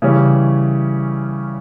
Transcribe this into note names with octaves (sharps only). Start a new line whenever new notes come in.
C#3 E3 G3 C#4